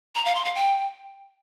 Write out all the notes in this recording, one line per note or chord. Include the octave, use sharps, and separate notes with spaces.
A#5
F5
C6
F5
G5